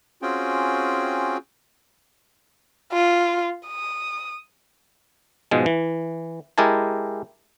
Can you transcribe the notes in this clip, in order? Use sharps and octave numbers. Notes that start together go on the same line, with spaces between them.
C4 C#4 F4 F#4 G#4 G5
F4
D#6
G#2 B2 F3 G#3
E3
G#3 E4 G4 A#4 G#5 A5